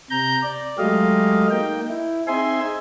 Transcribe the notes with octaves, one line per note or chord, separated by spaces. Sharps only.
C3 A#5 G6
D5
F#3 G#3 A3 G4 D#5 F5
A#3 D#4 G5
E4
C4 D#4 G#4 E5 G#5 C6